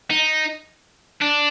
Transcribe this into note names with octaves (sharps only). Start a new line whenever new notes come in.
D#4
D4